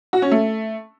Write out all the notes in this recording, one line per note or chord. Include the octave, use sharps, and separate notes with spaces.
F#4
C#4
A3